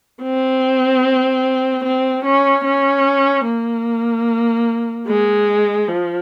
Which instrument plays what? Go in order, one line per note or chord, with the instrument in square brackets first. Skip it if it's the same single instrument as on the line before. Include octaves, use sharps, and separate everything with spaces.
[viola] C4
C4
C#4
C#4
A#3
G#3
F3